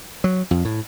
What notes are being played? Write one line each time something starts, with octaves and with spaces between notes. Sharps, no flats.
F#3
F2
A2